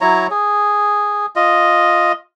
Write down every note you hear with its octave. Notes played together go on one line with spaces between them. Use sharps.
F#3 E4 C#5 A#5
G#4
F4 D#5